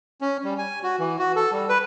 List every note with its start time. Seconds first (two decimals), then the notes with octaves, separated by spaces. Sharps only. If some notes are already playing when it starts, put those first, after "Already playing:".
0.21 C#4
0.44 G3
0.58 G#5
0.83 F#4
0.99 E3
1.19 F#4
1.36 A4
1.52 G3
1.69 B4